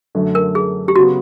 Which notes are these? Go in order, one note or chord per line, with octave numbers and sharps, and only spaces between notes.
F#2 D3 F#3 A3
A#4
G#4
G4
C#3 F#3 B3 F#4